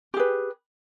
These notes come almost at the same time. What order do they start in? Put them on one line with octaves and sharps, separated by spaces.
G4 G#4 B4